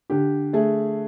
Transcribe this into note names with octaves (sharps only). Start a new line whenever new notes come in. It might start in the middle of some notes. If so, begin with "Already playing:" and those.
D3 G4
A3 G#4